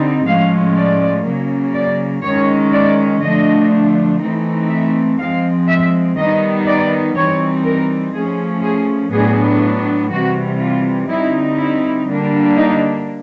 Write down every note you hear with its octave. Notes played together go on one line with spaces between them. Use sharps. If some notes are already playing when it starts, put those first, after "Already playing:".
Already playing: D3 G3 C4 D#4
A2 F3 G#3 C#4 F5
D5
C#3 F#3 A#3
D5
D#3 G#3 C#4 C#5
D5
D3 F3 A3 D4 D#5
E3 A3 C4 D#4
E5
F3 G#3 C4 F5
E5
D#3 G3 B3 D#4 D#5
D5
E3 G3 C4 D#4 C#5
A#4
F3 A3 C#4 G#4
G#4
A2 F#3 B3 D4 G#4
C3 E3 G3 F#4
F4
D3 G3 C4 D#4 E4
E4
D3 G3 A#3 D4
D#4